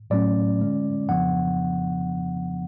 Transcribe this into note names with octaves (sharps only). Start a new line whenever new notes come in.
A2 F#3 A3 C#4 D5
D3 G#3 C#4
F2 C#3 F3 B3 D4 F#5